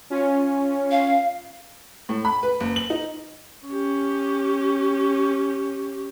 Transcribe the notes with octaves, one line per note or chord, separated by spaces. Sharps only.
C#4 F4
F5
A2
B5
B4
F#1
F#7
D#4
C#4 G4